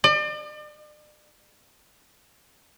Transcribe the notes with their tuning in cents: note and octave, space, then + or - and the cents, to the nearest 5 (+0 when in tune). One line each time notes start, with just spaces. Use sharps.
D5 +40